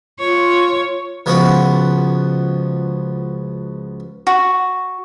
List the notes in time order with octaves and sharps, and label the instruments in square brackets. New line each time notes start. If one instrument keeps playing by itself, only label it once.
[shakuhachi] F4 [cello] C#5
[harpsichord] C#2 F3 B3 F#4 F#5
[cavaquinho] F#4